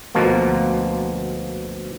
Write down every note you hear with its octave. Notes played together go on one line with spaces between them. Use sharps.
D2 B2 F3 A#3